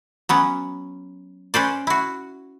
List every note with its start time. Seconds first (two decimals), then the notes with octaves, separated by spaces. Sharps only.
0.29 F#3 B3 C#4
1.54 C#4 B4 C5 D5
1.87 E4 F#4